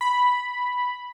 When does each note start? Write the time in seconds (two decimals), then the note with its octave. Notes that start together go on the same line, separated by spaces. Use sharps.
0.01 B5